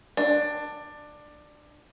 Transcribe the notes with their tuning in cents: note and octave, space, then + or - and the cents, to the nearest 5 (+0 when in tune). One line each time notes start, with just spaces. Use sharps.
D4 +15